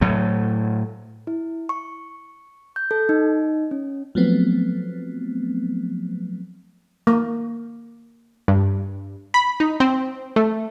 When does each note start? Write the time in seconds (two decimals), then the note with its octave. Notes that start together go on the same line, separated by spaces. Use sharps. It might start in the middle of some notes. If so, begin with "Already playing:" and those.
0.01 A2 F#3 A3
1.27 E4
1.69 C#6
2.76 G6
2.91 A4
3.09 D#4
3.71 C#4
4.15 F3 F#3 A3 B3 C4
7.07 A#3
8.48 G2
9.34 B5
9.60 D#4
9.80 C4
10.36 A3